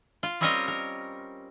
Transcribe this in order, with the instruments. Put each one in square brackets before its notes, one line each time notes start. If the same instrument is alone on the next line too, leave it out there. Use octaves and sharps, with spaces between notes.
[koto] F4
G3 C4 C#4 A#4 C#5 D#5
A#4